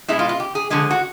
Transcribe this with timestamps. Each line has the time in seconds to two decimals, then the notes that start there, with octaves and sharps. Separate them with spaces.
0.08 B2 G#3 E4
0.19 F4
0.29 F4
0.40 G4
0.55 G#4
0.70 D3 F3 G#3 G#4
0.90 F#4